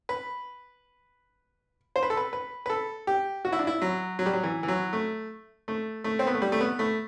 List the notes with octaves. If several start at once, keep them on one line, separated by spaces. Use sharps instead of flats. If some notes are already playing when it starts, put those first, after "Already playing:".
B4
C5
B4
A4
B4
B4
B4
A4
G4
F#4
E4
D4
E4
F#3
F#3
G3
F#3
E3
E3
F#3
A3
A3
A3
C4
B3
A3
G3
A3
B3
A3